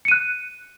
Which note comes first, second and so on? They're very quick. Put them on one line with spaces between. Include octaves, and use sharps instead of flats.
C#7 D#7 F#6